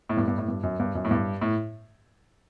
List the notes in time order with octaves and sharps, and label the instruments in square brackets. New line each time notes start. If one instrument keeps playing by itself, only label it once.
[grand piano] A2
G2
G2
A2
G2
F#2
G2
F#2
A2
G2
A2